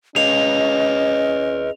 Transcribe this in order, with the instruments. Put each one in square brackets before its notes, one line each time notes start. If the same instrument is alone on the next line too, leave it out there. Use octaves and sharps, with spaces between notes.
[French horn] C#4 [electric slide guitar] G#4 B4 F5 [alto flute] D#5 [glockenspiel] F7